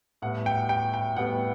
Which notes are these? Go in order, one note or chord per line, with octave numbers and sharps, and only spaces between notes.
A2 G3 B3 F#5
G5
G5
G5
A2 G3 B3 F#5